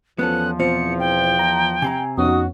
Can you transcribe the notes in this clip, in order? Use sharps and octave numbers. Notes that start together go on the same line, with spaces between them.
E2 F3 B3 C#4 A4 F#6
B2 C4 F4 C5 C#7
G5
A#5
C3 C4 G#5 A#5
F2 B3 C#4 D#4 F#4 D#6